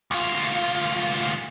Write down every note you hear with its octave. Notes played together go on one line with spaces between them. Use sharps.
D2 F4